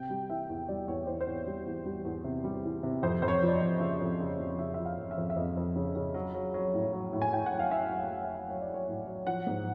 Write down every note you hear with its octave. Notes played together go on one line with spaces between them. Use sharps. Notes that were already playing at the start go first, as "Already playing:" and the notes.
Already playing: C3 G5
G3
E3 E5
E2
G3 D5
E2 C#5
E2 C5
C5
E2 C#5
G3
E2
G3
E2
C3
G3
E3
C3
F2 C5
F2 C5
C#5
F3
D5
D#5
F2
C#3 E5
F2
C#3
F2
C#3 E5
F3 E5
F5
F2
E5
F2
E5
F2 D#5
F2
C#3
C#3
F#3
F#3
F#3
A2
F#3
A2
G#5
A2 G5
F#5
F#3
F5
F#3 E5
F#3
F5
F#3
E5
F#3
F#3 C#5
D5
F#3
C#5
A2
F#3
F3 F#5
G#2